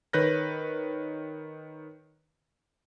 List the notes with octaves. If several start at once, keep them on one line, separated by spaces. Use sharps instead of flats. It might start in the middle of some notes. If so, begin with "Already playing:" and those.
D#3 B4 C#5 F#6 G6 A#6